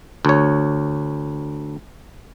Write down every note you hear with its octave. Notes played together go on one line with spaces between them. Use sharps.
D2 C#5